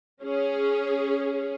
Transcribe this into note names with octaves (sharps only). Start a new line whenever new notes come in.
C#4 G#4